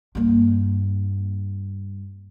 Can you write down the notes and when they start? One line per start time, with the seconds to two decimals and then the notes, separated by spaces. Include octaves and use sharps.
0.15 G2 A#3